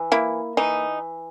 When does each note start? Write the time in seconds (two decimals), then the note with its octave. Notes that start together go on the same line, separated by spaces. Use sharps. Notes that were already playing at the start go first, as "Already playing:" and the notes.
Already playing: E3
0.12 A#3 E4
0.57 E3 D#4